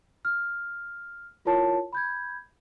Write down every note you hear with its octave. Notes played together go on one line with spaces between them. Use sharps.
F6
E4 F4 A#4 C#5 A5
B5 G6 G#6